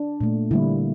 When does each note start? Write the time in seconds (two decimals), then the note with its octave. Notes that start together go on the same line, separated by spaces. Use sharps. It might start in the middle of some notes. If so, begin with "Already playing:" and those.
Already playing: D4
0.21 A#2 A3
0.51 D3 G3 A#3 E4